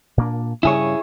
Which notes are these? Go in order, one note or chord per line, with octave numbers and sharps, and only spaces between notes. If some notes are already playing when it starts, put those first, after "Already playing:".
A#2 A#3 D4
G2 C#3 G3 E4 G#4 C#5